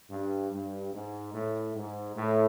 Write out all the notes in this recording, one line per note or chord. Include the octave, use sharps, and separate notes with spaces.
G2
G2
G#2
A2
G#2
A2